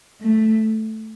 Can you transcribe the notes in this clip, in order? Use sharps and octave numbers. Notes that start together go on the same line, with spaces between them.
A3